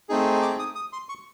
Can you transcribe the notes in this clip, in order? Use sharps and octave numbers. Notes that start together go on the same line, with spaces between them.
A3 C4 D#4 G#4
D6
D#6
D#6
C6
C#6